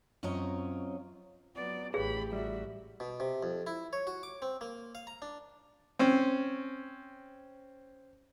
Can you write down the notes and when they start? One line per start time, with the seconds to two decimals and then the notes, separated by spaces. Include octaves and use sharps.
0.23 F#2 C4 F4 C#5 D#5 A#5
1.55 F#3 B3 D5
1.94 A1 G4 G#4 B4 C#5 F5 B5
2.33 G3 F#4 E5
3.00 B2
3.20 C3
3.43 F2
3.67 E4
3.93 C#5
4.07 F#4
4.23 D6
4.42 C4
4.61 A#3
4.95 F5
5.07 A#5
5.22 D4
5.99 C4 C#4